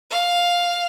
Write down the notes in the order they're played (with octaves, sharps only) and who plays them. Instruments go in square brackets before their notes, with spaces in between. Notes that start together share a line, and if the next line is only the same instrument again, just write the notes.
[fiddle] F5